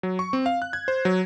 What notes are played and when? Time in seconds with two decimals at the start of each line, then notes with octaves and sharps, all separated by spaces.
0.03 F#3
0.19 C#6
0.33 C4
0.46 F5
0.62 F#6
0.73 G#6
0.88 C5
1.05 F#3